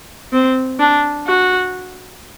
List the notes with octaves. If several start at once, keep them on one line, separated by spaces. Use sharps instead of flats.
C4
D4
F#4